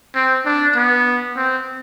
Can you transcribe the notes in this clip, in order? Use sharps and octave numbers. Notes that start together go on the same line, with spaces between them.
C4
D4
B3
C4